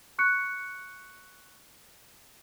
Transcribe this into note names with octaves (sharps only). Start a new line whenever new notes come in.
C#6 F#6 C#7